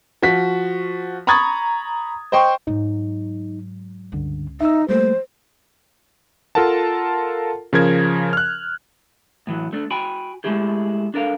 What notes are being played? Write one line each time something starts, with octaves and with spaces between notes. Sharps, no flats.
F3 F#4 B6
A#5 B5 C#6 D#6 G#6 A6
C5 D#5 G5 C6 C#6
G#2 F#3 D#4
C#2 G2 D3
B3 D#4 E5 E6
F3 G3 A3 A#3 C5
F4 A4 A#4 F#5 A5
C#3 F3 A#4 G#6
F6 F#6
A2 E3 F#3
A3 D4
F#4 G5 G#5 B5
G#3 A3 E4 G4 G#4
D4 A4 A#4 F5